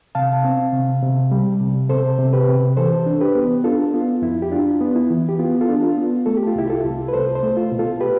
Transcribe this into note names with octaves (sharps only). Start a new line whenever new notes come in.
C3 F5 A5
C4
C3
C3
G3
C3
C3 A4 C5
C3
G4 B4
C3
E3 A4 C5
D4
G4 B4
B3
D4 F4 A4
B3 F4
F2 E4
G4
D4 F4
B3
E4
E3
G4
B3 F4
F4 A4
D4
F4
B3
A3 A4
G4
F4
C2 E4 G4
F4 A4
C2
B4
C2 A4 C5
A4 C5
A3
F4
B2
F4 A4
G4 B4